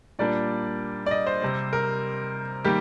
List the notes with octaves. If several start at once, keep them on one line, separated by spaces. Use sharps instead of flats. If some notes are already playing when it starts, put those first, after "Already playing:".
A#2 G3 A#3 D4 D5
D5
D#5
C5
C3 G3 C4
A#4
D#3 G3 A#3 G4